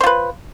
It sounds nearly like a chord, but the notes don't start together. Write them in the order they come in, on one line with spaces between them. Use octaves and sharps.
C5 F4 B4